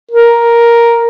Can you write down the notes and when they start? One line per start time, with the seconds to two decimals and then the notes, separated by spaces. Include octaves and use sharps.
0.12 A#4